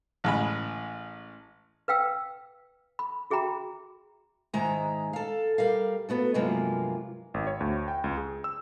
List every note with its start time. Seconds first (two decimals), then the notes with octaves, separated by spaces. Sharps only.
0.24 A1 G#3 B5
1.88 B4 F5 G5 E6
2.99 B5
3.30 F#4 G#4 E5 G5 A#5 B5
4.54 G#2 D#3 G#3 G#4 E5 A#5
5.13 A4 F5
5.58 G3 A#4 F5
6.09 B3 F#4 A4
6.34 G2 C3 F#3 G#3 A#3 F4
7.34 G#1
7.47 C#5
7.60 D2
7.88 G5
8.04 C#2
8.17 G#4
8.44 E6